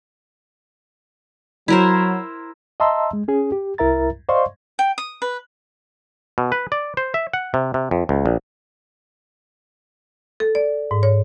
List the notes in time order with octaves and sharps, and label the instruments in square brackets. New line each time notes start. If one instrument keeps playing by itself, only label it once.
[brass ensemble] F#3 [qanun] E4 A#4 C5
[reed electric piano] D#5 E5 A5 A#5 C6 E6
G#3
C#4 G#4
G4
C2 E4 A#4 E5 A#5 A6
C5 D5 D#5 F5 C6 C#6
[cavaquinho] G5
D#6
B4
[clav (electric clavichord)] B2
B4
D5
C5
E5
F#5
C3
C3
F2
C#2
A#1
[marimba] A4
D5
G#2
C#5